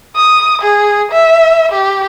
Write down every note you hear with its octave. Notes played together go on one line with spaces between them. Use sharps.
D#6
G#4
E5
G4